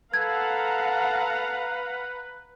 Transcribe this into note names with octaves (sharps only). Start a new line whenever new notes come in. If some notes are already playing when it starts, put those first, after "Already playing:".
A4 B4 F5 F#5 A#5 G#6